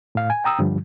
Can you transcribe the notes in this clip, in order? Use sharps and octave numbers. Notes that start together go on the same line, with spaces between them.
A2 F5
G#5
G5 A#5 D#6 E6
G2 D3 F3 G3